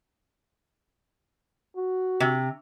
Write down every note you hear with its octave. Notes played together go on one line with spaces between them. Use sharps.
F#4
C3